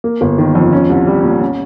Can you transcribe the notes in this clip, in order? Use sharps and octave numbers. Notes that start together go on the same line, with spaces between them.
A#3
G1
D#3
F2
C#4
C2
G3
A#2
C#4